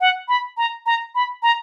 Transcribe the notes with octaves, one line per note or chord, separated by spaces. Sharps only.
F#5
B5
A#5
A#5
B5
A#5